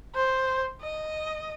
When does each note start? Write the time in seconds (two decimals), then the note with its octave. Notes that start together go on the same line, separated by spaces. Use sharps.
0.15 C5
0.81 D#5